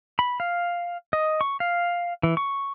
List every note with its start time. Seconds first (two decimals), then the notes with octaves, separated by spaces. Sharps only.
0.19 B5
0.40 F5
1.13 D#5
1.41 C#6
1.60 F5
2.23 E3
2.37 C#6